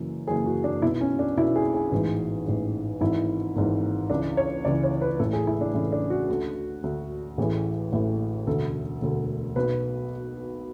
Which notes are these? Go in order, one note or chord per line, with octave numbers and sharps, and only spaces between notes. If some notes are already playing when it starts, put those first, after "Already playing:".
Already playing: F#1 F#2 E3
F#1 F#2 E3 G#4
F#4
D4
B1 B2 E4
C#4
D4
B1 B2 E4
G#4
G#4
A1 G#2 E3
A1 G#2 E3
G#1 G#2 E3 E4
G#1 G#2 E3
C#2 C#3 E3 D4
C#5
C#2 C#3 E3 D5
C#5
B4
A1 A2 E3 A4
G#4
E4
D4
A1 A2 E3 C#4
D4
F#4
D2 D3
D2 D3
A1 A2 E3 G#4
A1 A2 E3
E1 D2 D3 A4
E1 D2 D3
B1 B2 B4